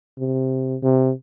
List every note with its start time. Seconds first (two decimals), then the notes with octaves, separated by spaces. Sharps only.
0.18 C3
0.83 C3